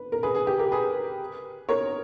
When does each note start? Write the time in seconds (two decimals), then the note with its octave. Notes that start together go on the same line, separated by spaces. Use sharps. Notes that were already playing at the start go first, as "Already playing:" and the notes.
Already playing: B4
0.12 A#4
0.23 G#4 B4
0.35 G#4
0.47 G4
0.59 G4 A#4
0.72 G#4 B4
1.69 A#4 C#5